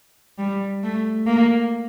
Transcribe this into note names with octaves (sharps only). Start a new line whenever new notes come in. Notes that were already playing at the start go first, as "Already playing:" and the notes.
G3
A3
A#3